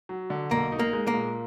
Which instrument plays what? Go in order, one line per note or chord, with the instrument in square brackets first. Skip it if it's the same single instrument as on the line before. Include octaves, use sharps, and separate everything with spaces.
[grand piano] F#3
D3
[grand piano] B1 [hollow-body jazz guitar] A#3
[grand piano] D#4
[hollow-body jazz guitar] A#3
[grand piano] G#3
[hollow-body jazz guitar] A#3
[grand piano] A#2